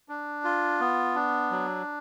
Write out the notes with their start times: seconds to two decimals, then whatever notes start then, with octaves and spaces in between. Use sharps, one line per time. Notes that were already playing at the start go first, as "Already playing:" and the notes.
0.09 D4
0.44 F4
0.80 B3
1.15 D4
1.51 F#3